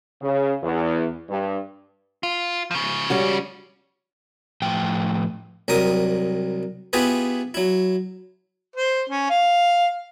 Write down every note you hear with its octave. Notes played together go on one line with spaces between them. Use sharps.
C#3
E2
G2
F4
C#3 F3
G3 C#4 F#4
A2 F3 G5
C2 F#3 G3 A#4 D#6
B3 E4 F4 G4 G#4 B4
F#3 E4
C5
C#4
F5